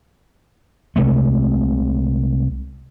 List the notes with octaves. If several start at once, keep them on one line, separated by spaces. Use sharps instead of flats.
C2 C3 G#3 A3